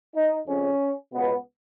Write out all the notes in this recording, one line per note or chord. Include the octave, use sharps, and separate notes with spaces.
D#4
F2 C#3 C#4
C#2 B2 B3